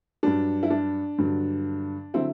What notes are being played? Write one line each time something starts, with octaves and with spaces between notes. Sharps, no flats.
G2 F#3 D4
E4
D4
G2 D3 F#3
D3 F#3 C4 E4